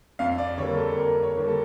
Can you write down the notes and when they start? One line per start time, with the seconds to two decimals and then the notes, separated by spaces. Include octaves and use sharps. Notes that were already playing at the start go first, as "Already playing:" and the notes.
0.19 F2 F5
0.38 D5
0.58 D3 C#5
0.61 G3 A#3
0.77 A4
0.97 F2 A#4
1.23 C#5
1.36 D3 G3 A#3
1.48 A4